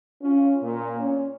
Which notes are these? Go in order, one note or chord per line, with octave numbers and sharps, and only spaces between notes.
C#4 F4
A#2
C#4